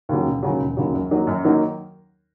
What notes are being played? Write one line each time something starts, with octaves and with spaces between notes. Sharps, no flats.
D#2 C#3 F#3
E1
D#2 C#3 F#3
E1
D#2 C#3 F#3
F#2
D#3 F#3 A#3 D#4
F#2
D#3 F#3 A#3 D#4